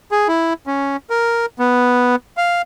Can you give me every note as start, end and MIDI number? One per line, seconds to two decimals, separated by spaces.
0.12 0.28 68
0.28 0.53 64
0.67 0.96 61
1.10 1.46 70
1.59 2.16 59
2.37 2.62 77